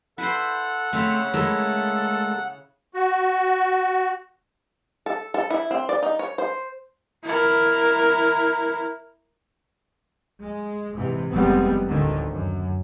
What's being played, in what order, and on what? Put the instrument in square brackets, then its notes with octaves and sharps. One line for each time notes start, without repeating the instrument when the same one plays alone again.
[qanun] E4 B4 C5 [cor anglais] A4 [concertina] F#5
[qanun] C#3 B5 [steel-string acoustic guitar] A3 [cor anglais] C4
[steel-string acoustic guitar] G#3 A3 A#4 [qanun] E4 [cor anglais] A4
[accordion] F#4
[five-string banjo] A4
A4
E4
C4
D5
D#4
C#5
C5
[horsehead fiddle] E4 A#4
[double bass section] G#3
G#2 C3 E3
F1 G3 G#3 B3 C4
D2 A2 D3 D#3
F#2